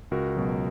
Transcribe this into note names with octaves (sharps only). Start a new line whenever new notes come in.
C#2 F#4 A#4
B2 F#3